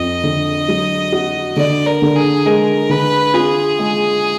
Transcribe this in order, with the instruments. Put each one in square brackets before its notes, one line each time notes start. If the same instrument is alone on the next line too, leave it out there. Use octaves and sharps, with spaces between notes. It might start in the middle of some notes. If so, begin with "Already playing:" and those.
Already playing: [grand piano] F2 [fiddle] D#5
[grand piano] D3
F#3
F#4
[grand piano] D3 [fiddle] D5
[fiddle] A#4
[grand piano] D3
[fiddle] G#4
[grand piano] G#3 [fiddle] A#4
[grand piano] D3 [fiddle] B4
[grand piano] F4 [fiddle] G#4
[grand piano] G#3